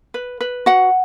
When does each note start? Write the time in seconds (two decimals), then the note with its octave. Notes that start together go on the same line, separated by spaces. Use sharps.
0.14 B4
0.41 B4
0.66 F#4 F#5